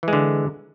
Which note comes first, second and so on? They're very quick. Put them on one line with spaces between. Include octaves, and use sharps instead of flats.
E3 G#3 D3